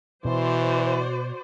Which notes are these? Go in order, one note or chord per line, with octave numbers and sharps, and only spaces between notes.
B2 E3 F#4 C5 D5